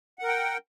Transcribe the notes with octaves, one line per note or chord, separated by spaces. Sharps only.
A#4 F#5 G5